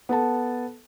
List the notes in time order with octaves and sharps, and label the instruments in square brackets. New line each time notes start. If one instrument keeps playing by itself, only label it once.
[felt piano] B3 A4 A5